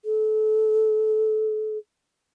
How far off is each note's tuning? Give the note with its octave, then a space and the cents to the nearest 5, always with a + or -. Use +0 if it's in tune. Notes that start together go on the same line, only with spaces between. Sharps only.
A4 -25